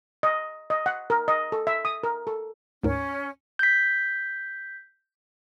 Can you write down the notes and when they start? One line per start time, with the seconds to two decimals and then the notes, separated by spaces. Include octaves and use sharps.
0.23 D#5
0.70 D#5
0.86 F#5
1.10 A#4
1.28 D#5
1.52 A4
1.67 E5
1.85 D#6
2.03 A#4
2.27 A4
2.83 D2 G#2 C#4 A#4
3.59 G6 B6